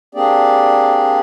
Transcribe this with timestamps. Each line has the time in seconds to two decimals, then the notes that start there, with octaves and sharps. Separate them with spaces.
0.15 A#3 C4 D4 G4 G#4 D5